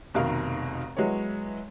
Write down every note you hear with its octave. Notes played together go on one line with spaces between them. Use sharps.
F1 B2 D#3 A#4 F5
F#3 G#3 B3 E4 C#5